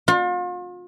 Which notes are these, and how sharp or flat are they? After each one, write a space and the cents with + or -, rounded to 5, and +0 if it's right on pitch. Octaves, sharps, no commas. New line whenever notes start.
F4 +40